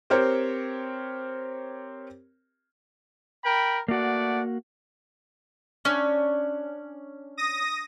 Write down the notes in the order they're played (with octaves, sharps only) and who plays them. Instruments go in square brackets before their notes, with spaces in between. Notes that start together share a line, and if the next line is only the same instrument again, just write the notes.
[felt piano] C4 G4 A#4 C5 C#5
[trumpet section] A#4 G5 B5
[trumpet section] A3 D5 F#5 [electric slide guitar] A#3 F#4
[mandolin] C#4 [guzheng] D4
[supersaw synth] D#6 A#6